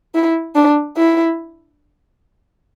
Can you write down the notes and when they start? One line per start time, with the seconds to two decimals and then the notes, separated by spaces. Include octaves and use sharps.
0.15 E4
0.55 D4
0.97 E4